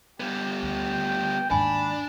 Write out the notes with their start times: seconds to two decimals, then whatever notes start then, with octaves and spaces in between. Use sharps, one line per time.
0.20 G3 B3 G4
0.63 D2 G5
1.51 D#2 G#2 D4 G#5 B5